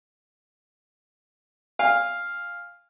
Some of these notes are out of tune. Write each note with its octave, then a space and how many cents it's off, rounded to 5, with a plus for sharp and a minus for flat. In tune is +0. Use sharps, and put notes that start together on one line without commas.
F5 +0 G#5 -35